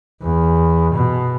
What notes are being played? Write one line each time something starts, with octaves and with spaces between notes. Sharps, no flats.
E2
B2